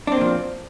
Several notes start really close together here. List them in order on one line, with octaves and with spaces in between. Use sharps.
D4 C4 A#2 F3